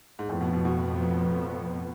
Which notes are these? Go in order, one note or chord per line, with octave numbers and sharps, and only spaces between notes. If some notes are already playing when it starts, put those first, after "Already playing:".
G#2
F2 A2 F3 B3
B2
B2
B2